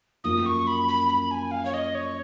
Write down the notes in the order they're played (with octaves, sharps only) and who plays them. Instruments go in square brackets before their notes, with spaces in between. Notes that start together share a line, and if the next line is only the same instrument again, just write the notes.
[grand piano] F#2 F3 A#3 F4 [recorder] D#6
[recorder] C#6
B5
B5
B5
G#5
F5
C#5
D#5
C#5